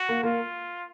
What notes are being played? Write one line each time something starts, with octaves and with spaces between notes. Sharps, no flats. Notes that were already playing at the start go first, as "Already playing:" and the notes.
Already playing: F#4
A#3
A#3 F4